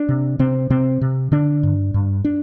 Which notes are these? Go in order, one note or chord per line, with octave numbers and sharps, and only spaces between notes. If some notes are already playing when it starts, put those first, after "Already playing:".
Already playing: D4
C3
C3 C4
C3 C4
C3
D3 D4
G2
G2
D4